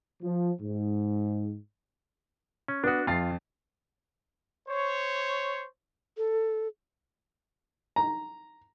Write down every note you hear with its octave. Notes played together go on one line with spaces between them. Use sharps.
F3
G#2
C#4
B3 D4 F#4 D#6
F2 F4 A6 C7
C5 C#5
A4
A#5